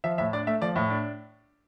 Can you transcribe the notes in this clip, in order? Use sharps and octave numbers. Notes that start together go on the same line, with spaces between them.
F3 E5
A2 E5
D4 D5
A3 E5
F3 D5
A2 E5
D4